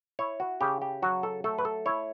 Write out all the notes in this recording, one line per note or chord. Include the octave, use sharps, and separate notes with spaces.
E4 C#5
F#4
C#3 G4
G4
F#3 F#4
A4
A3 A4
B4
A4
E4 C#5